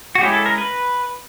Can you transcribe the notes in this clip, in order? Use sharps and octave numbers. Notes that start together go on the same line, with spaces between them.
F#4
G#3 C#4 E4 G4
A4
A#4
B4